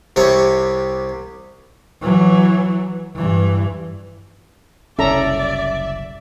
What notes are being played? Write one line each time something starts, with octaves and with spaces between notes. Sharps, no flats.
C2 C3 G3 C#5
E3 F#3
G2 E3
F#1 C2 C#4 A4 D5 E5 A#5